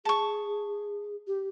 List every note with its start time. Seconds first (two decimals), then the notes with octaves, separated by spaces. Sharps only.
0.05 G#4 A5 C#6
1.27 G4